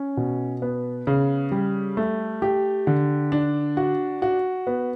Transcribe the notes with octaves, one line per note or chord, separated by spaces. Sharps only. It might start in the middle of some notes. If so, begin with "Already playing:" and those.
Already playing: C#4
B2
B3
C#3
G3
A3
G4
D3
D4
F#4
F#4
B3